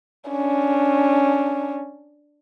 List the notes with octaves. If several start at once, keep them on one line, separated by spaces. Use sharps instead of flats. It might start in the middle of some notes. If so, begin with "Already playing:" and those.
C#4 D4